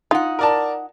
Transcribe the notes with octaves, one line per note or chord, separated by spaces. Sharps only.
D#4 F4 F#5
A#4 D5 A5